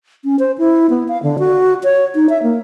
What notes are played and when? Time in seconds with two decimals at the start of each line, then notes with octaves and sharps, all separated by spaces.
0.24 C#4
0.39 C5
0.58 E4
0.90 B3
1.08 F5
1.23 D3
1.39 F#4
1.84 C#5
2.15 D#4
2.29 E5
2.43 A#3